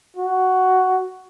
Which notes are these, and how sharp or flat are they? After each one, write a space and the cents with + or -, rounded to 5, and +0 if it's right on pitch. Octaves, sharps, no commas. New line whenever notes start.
F#4 +5